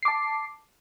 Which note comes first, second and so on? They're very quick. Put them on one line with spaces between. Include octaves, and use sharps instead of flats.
C7 D6 A5